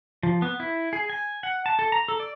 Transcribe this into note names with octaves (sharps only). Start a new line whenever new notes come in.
F3
B3
E4
G#4
G#5
F#5
A5
A4
A#5
A4
D5